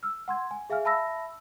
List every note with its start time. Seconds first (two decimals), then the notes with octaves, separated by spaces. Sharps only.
0.03 E6 F6
0.28 F#5 C6 G#6
0.51 G#5
0.70 G#4 E5 F5 G#5 F6
0.85 E5 A5 B5 E6 A#6